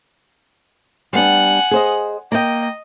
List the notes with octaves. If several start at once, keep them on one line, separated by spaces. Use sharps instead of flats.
G3 B3 D4 F#5 G#5
G#4 C5 D#5
A#3 D#5 G5